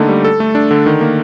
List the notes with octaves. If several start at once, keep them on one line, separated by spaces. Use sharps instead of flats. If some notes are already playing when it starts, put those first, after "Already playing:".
Already playing: D3 A3 A#3 D#4
G3
A4
A3
D4
D3
D#3
A#3